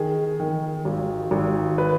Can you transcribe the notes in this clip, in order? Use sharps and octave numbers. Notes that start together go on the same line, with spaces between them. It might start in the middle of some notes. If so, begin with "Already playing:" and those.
Already playing: D#3 G#4
D#3
G#1
G#1
B4